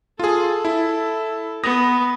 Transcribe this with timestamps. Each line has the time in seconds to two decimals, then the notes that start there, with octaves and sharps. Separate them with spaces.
0.19 F4 G#4 A4
0.65 E4
1.64 B3 D#6 A#6